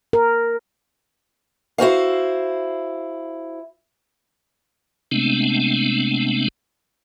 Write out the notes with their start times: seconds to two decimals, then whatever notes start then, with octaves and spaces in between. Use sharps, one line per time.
0.13 A#4
1.78 E4 F#4 C5 F5
5.12 C3 G#3 A3 B3 C4 D4